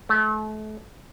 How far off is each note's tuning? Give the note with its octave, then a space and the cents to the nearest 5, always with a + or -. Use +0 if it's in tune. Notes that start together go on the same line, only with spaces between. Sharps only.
A3 -35